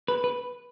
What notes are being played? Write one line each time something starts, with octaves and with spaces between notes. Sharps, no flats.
B4
B4